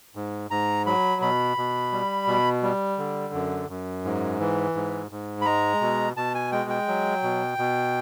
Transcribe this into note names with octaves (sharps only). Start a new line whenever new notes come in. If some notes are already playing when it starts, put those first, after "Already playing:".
G#2
G#2 A#5
F#3 B5
B2 B5
B2
G3
B2
G3
D3
F#2
F#2
G#2
E3
G#2
G#2
B5
G#3 A#5
B2
B2 A5
G#5
G#3 G5
G5
F#3
B2
B2